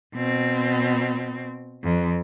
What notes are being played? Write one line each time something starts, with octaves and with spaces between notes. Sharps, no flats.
B2 C4
F2